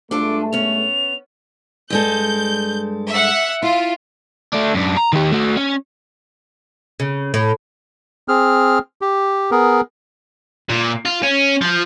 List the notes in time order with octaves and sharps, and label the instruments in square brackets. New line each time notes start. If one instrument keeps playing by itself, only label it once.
[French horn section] G2 G#3 A3 [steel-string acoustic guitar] D4 F4 A4 [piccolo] D6
[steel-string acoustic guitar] B3 C#4 [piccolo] F7
[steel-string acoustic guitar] G2 G#3 A4 [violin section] G6
[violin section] E5 F#5
[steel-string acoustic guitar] E4 [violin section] F4
[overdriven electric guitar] A3 D4
F#2 D4
A#5
D#3 G4
A3 F#4
C#4
[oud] C#3
A2
[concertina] C4 G#4 F6
G4
B3 G#4 A#4
[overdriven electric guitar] A#2
F4
C#4
F3